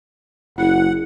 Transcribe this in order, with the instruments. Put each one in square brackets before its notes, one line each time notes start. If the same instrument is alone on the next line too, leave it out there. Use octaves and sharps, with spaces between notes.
[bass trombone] F#1 [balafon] E4 [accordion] F#5